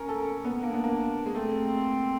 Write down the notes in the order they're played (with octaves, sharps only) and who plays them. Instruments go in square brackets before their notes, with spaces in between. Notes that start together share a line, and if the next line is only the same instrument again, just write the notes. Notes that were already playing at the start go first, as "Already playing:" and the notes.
Already playing: [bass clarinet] C#4 [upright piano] A#4
[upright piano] A4
B3
[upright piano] A#3 [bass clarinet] D4
[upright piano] B3
A#3
G#3
[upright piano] A3 [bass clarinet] C4